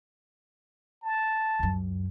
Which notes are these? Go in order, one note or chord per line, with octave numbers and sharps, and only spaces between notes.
A5
C#2 F#2